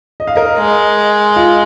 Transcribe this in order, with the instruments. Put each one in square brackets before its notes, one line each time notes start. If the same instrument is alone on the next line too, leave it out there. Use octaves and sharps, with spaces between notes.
[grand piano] D#5
F5
A#4 D#5
[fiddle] G#3
[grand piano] F4